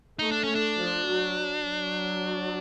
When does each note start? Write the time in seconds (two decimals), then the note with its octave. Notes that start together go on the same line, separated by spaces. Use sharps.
0.19 A3 D#4
0.32 D4
0.44 C#4
0.55 D4
0.78 F3
1.07 F#3
1.66 F#3